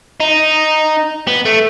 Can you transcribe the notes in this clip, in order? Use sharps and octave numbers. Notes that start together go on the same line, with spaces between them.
D#4
B3
A3